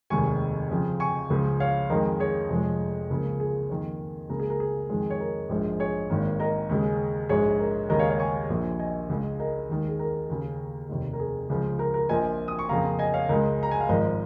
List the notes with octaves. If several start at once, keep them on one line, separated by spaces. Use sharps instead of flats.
F1 D#2 D#3 G#3 G#5 C#6
F2 C#3 F3
G#5 C#6
C#2 C#3 F3
C#5 F5
F2 D#3 G#3 A#4 D#5
G#4 C#5
F1 F2 F3 G#3
C#2 C#3 F3 A#3
G#4
F2 D#3 A#3
C#2 C#3 A#3 A#4
G#4
A#4
G#4
F2 D#3 G#3
C#5
A#4
A#1 G#2 F3 G#3
G#4 C#5
G#1 G#2 D#3 A#3
A#4 D#5
D#2 C#3 G#3
A#1 G#2 G#3 G#4 C#5
A#4
D#2 C#3 G#3 A#4 D#5
C#5 F5
C#5 F5
G#5 C#6
A#1 A#2 F3 A#3
D#5 G#5
C#2 C#3 G#3
A#4 D#5
D#2 D#3 G#3
G#4
A#4
D#2 C#3 A#3
F1 D#2 D#3
A#4
G#4
C#2 C#3 F3
A#4
A#4
A#1 A#2 F3 A#3 D#5 G#5
D#6
C#6
F2 C#3 A#3 F5 A#5
D#5 G#5
C#5 F5
C#2 C#3 G#3 A#4 D#5
A#5
G#5
F5
G#1 G#2 F3 A#4 D#5